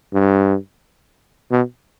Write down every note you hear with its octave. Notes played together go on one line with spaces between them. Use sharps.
G2
B2